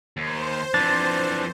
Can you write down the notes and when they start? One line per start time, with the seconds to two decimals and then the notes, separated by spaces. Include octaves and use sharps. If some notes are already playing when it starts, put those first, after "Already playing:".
0.17 D#2 C5
0.74 F2 E3 D4 A6